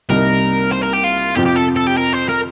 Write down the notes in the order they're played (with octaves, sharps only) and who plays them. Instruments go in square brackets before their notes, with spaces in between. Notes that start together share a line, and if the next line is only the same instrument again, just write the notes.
[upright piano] C2 C3 G3 A#3 D#4 [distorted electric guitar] A#4
[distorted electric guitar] C5
A#4
G4
F4
[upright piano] F2 C3 F3 C4 F4 [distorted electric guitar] G4
[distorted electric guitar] G4
A4
A4
G4
A#4
C5
A#4